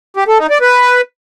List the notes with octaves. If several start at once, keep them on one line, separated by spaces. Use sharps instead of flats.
G4
A4
D#4
D5
B4